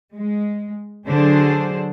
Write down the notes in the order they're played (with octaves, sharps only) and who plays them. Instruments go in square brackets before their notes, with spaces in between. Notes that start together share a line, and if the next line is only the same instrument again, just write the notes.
[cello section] G#3
D3 F#3 D4 G#4 C5